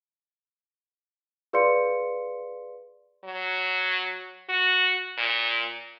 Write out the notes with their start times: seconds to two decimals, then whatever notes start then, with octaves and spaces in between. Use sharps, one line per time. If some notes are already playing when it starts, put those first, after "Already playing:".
1.53 G#4 B4 D5 F5 C6 C#7
3.24 F#3
4.49 F#4
5.18 A#2